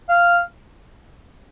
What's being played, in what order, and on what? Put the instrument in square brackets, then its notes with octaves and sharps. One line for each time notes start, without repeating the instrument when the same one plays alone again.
[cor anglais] F5